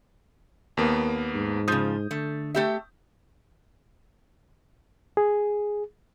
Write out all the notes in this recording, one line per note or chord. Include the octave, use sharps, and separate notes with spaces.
D#2 A#3 B3
G#2
C#3 F3 D#6 G6
D3 A3
A3 G4 E5
G#4